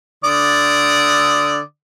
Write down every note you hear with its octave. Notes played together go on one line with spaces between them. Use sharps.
D3 D5 D#6